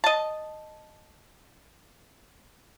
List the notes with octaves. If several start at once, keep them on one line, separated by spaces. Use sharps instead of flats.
D#5 A5